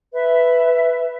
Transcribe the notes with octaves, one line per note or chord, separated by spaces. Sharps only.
B4 E5